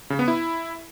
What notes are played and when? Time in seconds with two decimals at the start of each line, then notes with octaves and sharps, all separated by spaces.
0.10 C#3
0.19 B3
0.28 E4